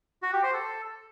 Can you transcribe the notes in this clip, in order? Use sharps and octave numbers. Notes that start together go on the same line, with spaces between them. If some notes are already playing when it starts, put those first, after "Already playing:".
F#4
G4
C5
A4